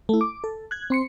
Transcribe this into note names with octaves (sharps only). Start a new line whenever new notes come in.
A3 E4
D6
A4
F#6 G#6
C4 C6 C#7